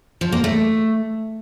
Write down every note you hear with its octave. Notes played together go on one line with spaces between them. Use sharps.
F3
A#3
A3